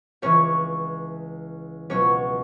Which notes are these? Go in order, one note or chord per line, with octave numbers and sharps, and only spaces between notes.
C#2 C#3 E3 C#4 C#5
C#2 B2 F#3 C#4 C#5